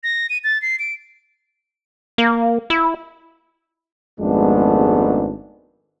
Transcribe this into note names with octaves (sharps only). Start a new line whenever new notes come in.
A#6
D#7
A6
C7
D7
A#3
E4
G#1 F2 G#3 A3 B3 D4